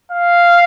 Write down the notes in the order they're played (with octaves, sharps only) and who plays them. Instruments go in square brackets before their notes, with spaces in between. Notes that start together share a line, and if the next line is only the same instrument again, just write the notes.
[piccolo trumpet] F5